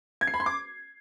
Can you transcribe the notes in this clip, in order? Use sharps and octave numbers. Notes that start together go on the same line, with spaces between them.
G#6
C7
B5
C6
D6